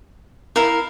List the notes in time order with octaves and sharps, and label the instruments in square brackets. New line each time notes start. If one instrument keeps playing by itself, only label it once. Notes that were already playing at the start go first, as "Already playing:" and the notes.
[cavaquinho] E4 A#4 F5